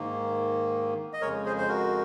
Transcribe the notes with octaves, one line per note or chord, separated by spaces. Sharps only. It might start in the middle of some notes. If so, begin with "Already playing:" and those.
Already playing: G#2 D#3 A#3
D#5
F2 C#3 G#3 A#4 C#5
G#4 C5
C5
F#4 A#4